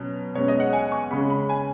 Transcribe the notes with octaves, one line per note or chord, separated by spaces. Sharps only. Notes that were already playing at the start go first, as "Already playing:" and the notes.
Already playing: B2 F#3 C#4
B2 G#3 C#4 C#5
D#5
F#5
G#5
C#6
C#3 G#3 C#4 B5
B5
G#5